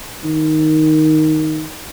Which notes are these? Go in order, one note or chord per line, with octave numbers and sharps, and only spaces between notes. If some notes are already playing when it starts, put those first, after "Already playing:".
D#3